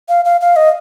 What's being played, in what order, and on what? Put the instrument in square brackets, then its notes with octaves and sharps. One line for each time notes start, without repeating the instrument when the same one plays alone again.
[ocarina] F5
F5
F5
D#5